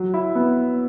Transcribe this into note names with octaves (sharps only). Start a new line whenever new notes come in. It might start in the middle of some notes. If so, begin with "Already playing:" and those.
Already playing: F#3
E4
B3